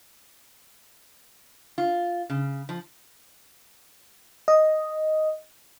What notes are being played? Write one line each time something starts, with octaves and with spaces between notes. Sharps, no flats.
F4
C#3
F3
D#5